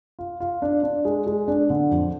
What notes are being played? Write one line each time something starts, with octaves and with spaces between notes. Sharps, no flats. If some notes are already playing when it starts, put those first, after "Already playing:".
F4
F4
D4
D4
G#3
G#3
D4
D3
F2